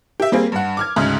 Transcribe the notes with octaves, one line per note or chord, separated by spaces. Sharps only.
G4 E5
G3 A#3 C4 G#4
G2 F#5
D6 F6 G#6
D2 G#2 C#3